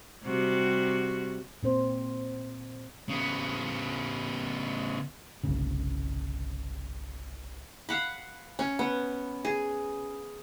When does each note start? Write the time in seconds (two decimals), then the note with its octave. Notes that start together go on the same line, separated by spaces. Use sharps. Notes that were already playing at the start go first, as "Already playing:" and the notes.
0.24 C3 G3 F#4
1.63 A#2 C4 C5
3.09 C#3 B3
5.43 G1 C2 C#3
7.89 F5 F#5 B5
8.59 C#4
8.79 B3
9.45 G#4